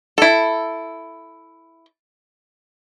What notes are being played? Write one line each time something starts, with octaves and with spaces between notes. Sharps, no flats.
E4 A4